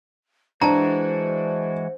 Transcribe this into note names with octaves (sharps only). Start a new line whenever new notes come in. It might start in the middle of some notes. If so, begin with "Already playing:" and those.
E3 G#3 D4 F#4 C5 A5 A#5